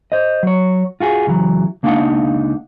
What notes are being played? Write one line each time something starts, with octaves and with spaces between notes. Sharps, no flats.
C5 D#5
F#3 C#5
F4 F#4 G#4
C#2 E3 F#3
C#2 A#3 D4 D#4 F5 F#5